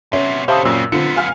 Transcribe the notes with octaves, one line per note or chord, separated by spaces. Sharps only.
C3 B3 C#4 E5
B2 D3 G4 C5 E5 F5 A5 D#6
F#2 A#2 C#3 C4 E6
F#2 D3 B3 C4 F4 C#7
F5 G#5 F6